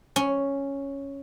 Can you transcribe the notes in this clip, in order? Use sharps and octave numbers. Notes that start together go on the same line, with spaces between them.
C#4